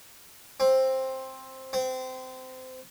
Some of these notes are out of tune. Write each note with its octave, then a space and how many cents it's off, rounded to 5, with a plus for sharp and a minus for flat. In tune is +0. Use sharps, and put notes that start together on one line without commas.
C4 +10
C4 -25